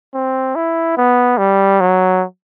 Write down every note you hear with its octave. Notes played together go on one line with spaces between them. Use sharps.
C4
E4
B3
G3
F#3